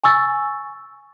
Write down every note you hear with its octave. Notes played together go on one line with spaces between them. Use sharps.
G#5 C#6 E6 A6